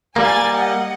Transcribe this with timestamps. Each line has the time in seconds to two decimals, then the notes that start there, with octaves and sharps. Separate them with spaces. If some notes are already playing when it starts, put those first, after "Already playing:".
0.16 G3 A#3 G#5 A6
0.55 D#5 F#5